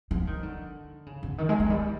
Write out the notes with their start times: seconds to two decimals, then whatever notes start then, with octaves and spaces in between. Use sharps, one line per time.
0.11 F3
0.27 D#3
0.43 D3
1.06 C#3
1.23 D3
1.38 D#3
1.49 G#3
1.60 G#3
1.66 F#3
1.70 G3